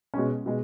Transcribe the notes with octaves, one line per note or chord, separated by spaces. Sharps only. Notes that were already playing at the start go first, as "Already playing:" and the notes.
B2 G#3 C#4
B2 G#3